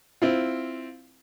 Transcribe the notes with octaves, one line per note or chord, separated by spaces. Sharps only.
C4 E4 F4